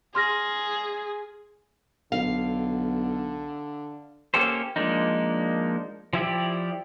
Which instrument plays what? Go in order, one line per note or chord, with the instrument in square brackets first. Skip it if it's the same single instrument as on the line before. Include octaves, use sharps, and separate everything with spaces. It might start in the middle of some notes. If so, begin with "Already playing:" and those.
[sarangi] G#4 [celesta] C6 F6 A#6
[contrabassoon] B1 [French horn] D3 [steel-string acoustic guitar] F5
[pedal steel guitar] A#3 C#4 G4 A4 C5
F3 G#3 A#3 D4 D#4
F3 E4 G4 D5